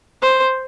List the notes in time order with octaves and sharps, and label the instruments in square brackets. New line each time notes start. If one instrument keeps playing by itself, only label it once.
[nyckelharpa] C5